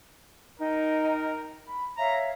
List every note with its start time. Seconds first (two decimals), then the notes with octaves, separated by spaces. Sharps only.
0.60 D#4 A#4 G5
1.67 B5
1.97 C#5 E5 F5 A#5